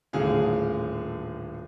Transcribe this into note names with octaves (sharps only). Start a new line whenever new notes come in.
D#1 A2 D3 F#3 G#4 F5